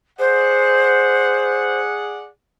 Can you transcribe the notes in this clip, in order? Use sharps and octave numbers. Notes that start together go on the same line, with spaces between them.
G#4 C5 D5 F#5